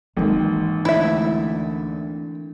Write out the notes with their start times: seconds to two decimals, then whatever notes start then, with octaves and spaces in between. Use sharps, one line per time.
0.17 G#1 D#2 D#3 E3 G#3
0.85 D2 E4 E5